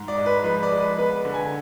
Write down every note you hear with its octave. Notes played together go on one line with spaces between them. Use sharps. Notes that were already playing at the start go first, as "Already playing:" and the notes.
Already playing: G#2
D5
G#3
B4
F3 B4
D5
G#3
B4
B3 B4
D3
G#5